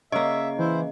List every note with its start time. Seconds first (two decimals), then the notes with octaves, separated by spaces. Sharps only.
0.12 C#3 A#3 D#5 E5
0.59 E3 E4 C5